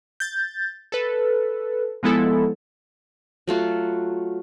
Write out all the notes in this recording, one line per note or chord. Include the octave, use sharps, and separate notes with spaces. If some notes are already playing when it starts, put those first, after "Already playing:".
G6 A6
A4 B4
F3 G#3 B3 E4 A4
F#3 A3 F4 F#4